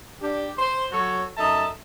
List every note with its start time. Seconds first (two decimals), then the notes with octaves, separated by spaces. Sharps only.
0.21 D4 G4
0.58 C5
0.91 F#3 F#4 A4 C#5
1.37 F#2 D#4 A4 E5 A5